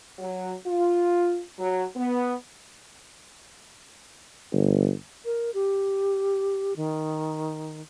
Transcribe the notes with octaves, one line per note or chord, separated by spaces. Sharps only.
F#3
F4
F#3
B3
G1
A#4
G4
D#3